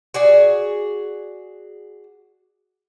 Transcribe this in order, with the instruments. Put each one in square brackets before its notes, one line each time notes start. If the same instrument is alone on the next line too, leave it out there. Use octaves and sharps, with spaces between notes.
[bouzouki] F#4 G#4 D5